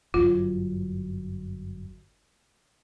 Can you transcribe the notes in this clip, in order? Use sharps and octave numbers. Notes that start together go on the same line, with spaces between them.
G1 F#2 F#3 F4